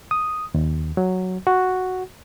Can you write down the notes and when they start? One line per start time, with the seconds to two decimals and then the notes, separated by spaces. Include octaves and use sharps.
0.11 D#6
0.54 D#2
0.97 F#3
1.47 F#4